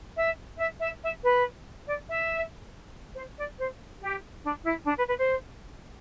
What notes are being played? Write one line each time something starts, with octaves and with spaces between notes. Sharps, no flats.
E5
E5
E5
E5
B4
D5
E5
C5
D5
C5
G4
D4
E4
D4
B4
B4
C5